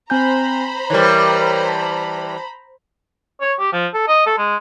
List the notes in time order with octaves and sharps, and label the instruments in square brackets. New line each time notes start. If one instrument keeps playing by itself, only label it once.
[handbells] C4 G#5 G6 [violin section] C5 A#5 B5
[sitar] E3 G3 [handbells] A#4 C#5
[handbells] A5
[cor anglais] C#5
G4
F3
A4
D#5
A4
G#3